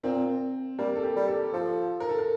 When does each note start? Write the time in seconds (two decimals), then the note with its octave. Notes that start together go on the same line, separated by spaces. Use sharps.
0.03 A#2 C4
0.78 G3 A#3
0.95 A4
1.03 G4
1.16 G3
1.28 A4
1.53 F3 A4
2.00 A#4
2.09 A4
2.19 A#4